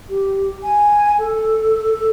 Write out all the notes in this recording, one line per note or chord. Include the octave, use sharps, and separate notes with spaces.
G4
G#5
A4
A4